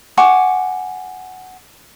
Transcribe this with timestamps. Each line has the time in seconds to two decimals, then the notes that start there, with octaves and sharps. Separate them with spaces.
0.17 F#5 G#5 C#6 D6